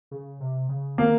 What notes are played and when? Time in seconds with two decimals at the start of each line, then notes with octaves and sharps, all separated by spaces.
0.11 C#3
0.40 C3
0.69 C#3
0.98 D#3 A#3